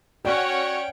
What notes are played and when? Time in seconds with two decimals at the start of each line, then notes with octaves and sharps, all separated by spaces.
0.25 C#4 F#4 C#5 D5 F#5 G5